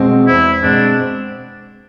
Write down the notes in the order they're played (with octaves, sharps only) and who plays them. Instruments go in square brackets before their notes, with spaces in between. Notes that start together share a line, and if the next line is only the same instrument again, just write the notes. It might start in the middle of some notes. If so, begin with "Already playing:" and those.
Already playing: [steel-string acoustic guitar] B2 G#3 C4
[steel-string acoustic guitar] E2 [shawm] E4
[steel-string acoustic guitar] B2 G#3 C4 [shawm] D4